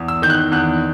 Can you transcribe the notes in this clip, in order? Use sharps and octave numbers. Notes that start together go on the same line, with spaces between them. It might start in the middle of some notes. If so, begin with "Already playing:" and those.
Already playing: E2
E6
D#3 G6
F#6
E2 F#6